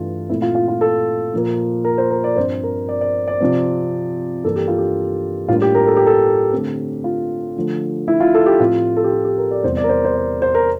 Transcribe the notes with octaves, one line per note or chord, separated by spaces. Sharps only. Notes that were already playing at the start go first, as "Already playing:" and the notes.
Already playing: G2 E3 A3 F4
A#2 A3 C4 E4
F4
F4
F4
A4
A#2 F3 A#3
A#4
C5
A#4
D5
G2 F3 C4 C5
A#4
D5
D5
D5
C3 F3 C4
G2 E3 A#3 D4 A4
G4
F4
G4
A2 G3 A#3 D4 F4
G4
A#4
A4
G4
A4
D3 A3 C4
F4
D3 F3 A3
E4
F4
A4
G4
A2 F3 C4 F4
A4
G4
F4
G4
A#4
D5
E2 C3 E3 G3 C5
D5
A#4
C5
C5
D5
C5
A#4